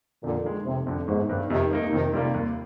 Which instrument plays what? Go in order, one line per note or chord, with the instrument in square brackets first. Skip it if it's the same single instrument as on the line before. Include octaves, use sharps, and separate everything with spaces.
[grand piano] F2 [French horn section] A#2 D3
[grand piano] D#3 G#3
[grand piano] F1 [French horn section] C3
[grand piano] F2 D3
[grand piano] G1 [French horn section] G#2
[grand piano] G2 D#3
[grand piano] F2 [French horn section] C3 D#3
[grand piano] D#3 A#3 D#4
[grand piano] F2 [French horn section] C3 D#3
[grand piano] C3 G3 A#3 F4
D#2